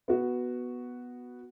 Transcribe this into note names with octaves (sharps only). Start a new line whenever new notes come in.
B3 F#4